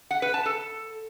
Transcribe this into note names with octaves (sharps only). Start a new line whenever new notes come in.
F#5
B4
A5
A4